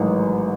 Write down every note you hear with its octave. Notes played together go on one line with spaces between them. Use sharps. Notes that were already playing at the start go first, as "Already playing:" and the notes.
Already playing: A1 G#2 D#3 F#3